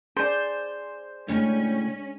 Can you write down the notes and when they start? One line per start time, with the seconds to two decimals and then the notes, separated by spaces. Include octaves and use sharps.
0.17 G#4 C5 D5
1.28 A2 C#3 G#3 C#4 D4